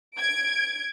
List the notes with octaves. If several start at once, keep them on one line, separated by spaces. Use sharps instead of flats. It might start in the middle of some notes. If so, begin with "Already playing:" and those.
G#6 D7